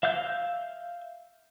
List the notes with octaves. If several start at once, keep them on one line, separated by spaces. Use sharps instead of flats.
E5 F5 E6 G6